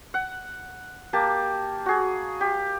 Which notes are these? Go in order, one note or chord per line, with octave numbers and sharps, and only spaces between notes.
F#5
A#3 G4 A5
F#4 G#4
G4